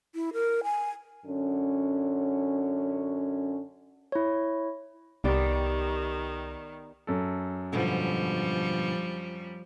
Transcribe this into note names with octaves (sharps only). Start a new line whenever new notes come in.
E4
A#4
G#5
F#2 D3 C#4
E4 C#5
C2 D#3 B3 G4 D5
F#2 A4
G#2 B2 D3 F3 G3